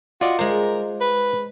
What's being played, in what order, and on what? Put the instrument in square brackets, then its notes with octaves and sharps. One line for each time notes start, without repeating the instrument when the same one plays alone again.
[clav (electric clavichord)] F4 D5 D#5 [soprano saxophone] F#4
[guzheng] G#3 C5 [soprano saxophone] A#4
[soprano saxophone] B4